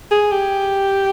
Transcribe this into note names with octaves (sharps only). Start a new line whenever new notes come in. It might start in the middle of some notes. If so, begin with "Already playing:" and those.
G#4
G4